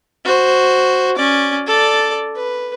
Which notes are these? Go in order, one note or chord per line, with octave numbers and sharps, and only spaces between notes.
F#4 C5
C#4 D5
A4 D5
B4